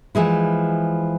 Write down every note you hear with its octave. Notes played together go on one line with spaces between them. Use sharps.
E3 F3 G#3 E4